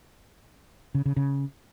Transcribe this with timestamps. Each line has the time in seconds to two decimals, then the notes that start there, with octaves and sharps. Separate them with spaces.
0.95 C#3
1.06 C#3
1.16 C#3